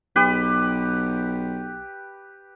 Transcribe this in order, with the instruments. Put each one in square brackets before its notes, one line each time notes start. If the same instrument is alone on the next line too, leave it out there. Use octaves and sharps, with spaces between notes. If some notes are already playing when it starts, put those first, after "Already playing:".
[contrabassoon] B1 [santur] G4 B4